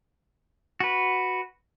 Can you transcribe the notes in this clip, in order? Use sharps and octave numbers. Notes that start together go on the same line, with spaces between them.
F#4 B4